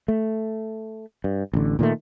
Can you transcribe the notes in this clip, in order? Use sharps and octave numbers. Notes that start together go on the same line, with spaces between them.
A3
G2
A1 D3
A#2 D#3 G3 A3